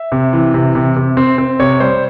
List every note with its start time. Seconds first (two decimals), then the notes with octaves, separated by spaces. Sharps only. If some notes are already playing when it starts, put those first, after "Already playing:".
Already playing: E5
0.12 C3
0.33 E3
0.54 C3
0.75 C3
0.96 C3
1.17 C4
1.38 C4
1.60 C3 C#5
1.80 G3 C5